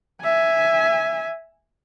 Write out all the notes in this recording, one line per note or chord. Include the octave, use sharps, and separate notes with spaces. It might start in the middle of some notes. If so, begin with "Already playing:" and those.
E5 G#5